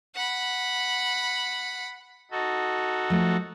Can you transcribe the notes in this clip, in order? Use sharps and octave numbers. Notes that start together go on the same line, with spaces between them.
F#5 B5
D#4 F#4 A4
F3 A3